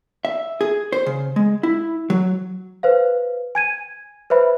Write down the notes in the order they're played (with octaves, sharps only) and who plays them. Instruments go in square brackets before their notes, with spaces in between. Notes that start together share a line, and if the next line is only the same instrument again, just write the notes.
[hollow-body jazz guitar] E5
G#4
C5
C#3
G#3
E4
F#3
[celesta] B4 C5 F5
G#5 G#6 D#7
B4 C5 E5 B5